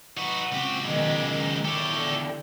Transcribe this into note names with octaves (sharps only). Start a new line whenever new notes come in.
D#4 F#4 B4
C#2 C4 G4
F#2 B2 D#3 G#3
D#3
E2 G4 A4 C#5
D3